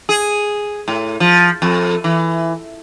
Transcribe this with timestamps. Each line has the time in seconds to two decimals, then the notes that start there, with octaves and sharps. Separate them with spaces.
0.09 G#4
0.88 A2
1.20 F3
1.62 F2
2.04 E3